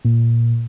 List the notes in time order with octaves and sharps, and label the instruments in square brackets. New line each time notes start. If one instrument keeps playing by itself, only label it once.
[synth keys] A#2